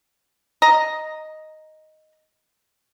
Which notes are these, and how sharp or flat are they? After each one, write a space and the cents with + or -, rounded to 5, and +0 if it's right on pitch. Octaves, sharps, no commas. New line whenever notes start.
D#5 +0 A#5 +0